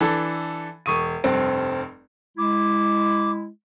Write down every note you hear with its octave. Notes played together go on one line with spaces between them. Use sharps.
E3 D4 A4
E1 C#6 D#6 D#7
F1 G2 C4
G#3 E4 D6